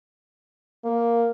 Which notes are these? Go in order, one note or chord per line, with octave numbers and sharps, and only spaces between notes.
A#3